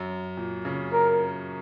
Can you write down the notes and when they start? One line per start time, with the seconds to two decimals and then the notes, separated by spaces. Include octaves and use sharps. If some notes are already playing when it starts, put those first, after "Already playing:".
Already playing: F#2
0.37 A#2
0.65 C#3
0.93 A#4